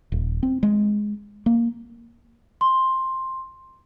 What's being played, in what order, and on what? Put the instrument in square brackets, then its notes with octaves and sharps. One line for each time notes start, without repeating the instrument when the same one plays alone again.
[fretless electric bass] D#1
C4
G#3
A#3
[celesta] C6